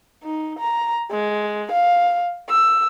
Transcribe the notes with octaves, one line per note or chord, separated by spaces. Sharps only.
D#4
A#5
G#3
F5
E6